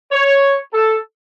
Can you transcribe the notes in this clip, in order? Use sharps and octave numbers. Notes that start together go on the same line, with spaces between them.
C#5
A4